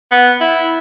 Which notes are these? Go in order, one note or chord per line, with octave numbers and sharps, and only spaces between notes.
B3
E4